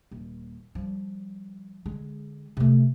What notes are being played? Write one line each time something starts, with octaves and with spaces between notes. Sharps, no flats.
D#1
F3 G3
D3 G#3
C3 A3